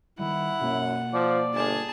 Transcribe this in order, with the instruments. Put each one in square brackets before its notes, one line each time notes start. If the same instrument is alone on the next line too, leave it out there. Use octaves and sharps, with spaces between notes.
[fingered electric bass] D#3 G3 [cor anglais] E4 [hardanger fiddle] F#5
[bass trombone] F#2 [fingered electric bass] B2 A#3
[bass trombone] F3 [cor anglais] D5
[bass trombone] G1 [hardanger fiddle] G#4 A5